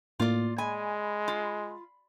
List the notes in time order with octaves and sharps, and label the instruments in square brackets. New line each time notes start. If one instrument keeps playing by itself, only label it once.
[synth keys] A2 A#3 [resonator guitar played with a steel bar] F4 D5
[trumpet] G#3 [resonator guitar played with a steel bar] G#5 [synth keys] B5
[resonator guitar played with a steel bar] F4